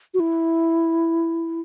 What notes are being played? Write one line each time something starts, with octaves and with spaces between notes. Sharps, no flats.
F#4
E4